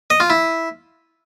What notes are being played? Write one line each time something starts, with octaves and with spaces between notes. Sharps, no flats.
D#5
F4
E4